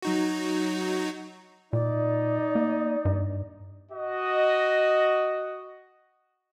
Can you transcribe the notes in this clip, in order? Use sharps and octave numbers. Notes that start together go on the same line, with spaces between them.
F#3 D#4 F#4
A#2 D#4 D5
A#3
G2
F#4 D#5